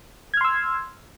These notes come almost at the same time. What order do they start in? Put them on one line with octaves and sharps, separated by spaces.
G#6 F6 C6 E6